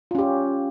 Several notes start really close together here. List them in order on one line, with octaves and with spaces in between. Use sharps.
F4 C#4 G4